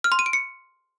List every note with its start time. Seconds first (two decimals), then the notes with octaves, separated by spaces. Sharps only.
0.04 F6
0.12 C6
0.19 D#7
0.26 D7
0.33 C#7